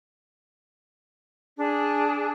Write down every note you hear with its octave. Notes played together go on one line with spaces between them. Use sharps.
D4 G#4